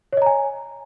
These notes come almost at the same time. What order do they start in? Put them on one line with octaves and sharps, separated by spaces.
C#5 D#5 A#5 G#5